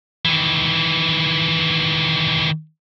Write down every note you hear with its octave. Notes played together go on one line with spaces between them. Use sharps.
D#3 E3